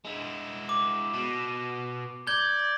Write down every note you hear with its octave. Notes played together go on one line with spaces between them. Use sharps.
G#3 E4
D6
B2
D5 G6 G#6 G7